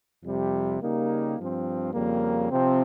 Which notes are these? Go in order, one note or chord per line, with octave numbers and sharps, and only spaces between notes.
F2 C3 G3
C#3 G3 A#3 D#4 G4
G2 F3 C4
F2 C#3 G3 A#3
C3 F3 C4